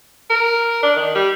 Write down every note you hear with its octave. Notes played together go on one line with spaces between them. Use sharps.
A#4
D4
D#3
G3